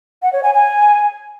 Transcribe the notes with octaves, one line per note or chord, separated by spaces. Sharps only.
F#5
C#5
G#5
G#5